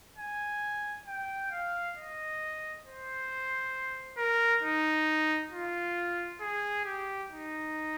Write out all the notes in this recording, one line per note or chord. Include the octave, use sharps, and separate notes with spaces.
G#5
G5
F5
D#5
C5
A#4
D#4
F4
G#4
G4
D#4